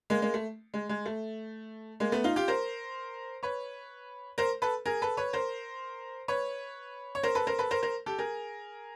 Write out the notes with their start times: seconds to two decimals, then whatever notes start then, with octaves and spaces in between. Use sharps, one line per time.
0.10 G#3 A#3
0.22 G#3 A#3
0.34 A3
0.74 G#3
0.89 G#3
1.06 A3
2.00 G#3 A#3
2.12 A3 B3
2.24 D#4 F4
2.36 F4 G4
2.48 A#4 C5
3.43 B4 C#5
4.38 A#4 C5
4.62 A4 B4
4.86 G#4 A#4
5.02 A4 B4
5.17 B4 C#5
5.33 A#4 C5
6.28 B4 C#5
7.15 C#5
7.23 A#4 C5
7.35 A4 B4
7.47 A#4 C5
7.59 A4 B4
7.71 A#4 C5
7.82 A#4 C5
8.06 G4 A4
8.18 G#4 A#4